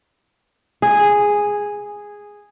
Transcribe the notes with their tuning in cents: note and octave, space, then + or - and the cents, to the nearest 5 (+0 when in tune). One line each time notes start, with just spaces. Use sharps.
G#4 -5